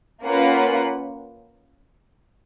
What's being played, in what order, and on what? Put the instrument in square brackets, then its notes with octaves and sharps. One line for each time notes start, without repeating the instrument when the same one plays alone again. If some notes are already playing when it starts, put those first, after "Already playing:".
[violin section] A#3 C#4 F4 B4 F#5